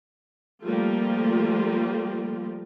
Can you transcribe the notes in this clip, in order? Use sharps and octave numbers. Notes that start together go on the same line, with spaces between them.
F3 G3 A3 A#3 F4